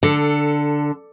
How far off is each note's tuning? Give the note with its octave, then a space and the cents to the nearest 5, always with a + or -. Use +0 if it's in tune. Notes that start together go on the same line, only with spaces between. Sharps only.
D3 +0 A4 +20